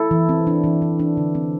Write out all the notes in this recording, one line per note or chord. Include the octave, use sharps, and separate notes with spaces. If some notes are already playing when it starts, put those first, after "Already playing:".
Already playing: E4 A4
E3
C4
D4
E3
E3
D4
D3
C4